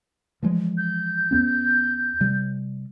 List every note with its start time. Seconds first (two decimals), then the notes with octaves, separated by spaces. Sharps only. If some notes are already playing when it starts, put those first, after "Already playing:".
0.43 E3 F3 G#3
0.78 G6
1.31 E2 B3 C#4
2.21 C3 G3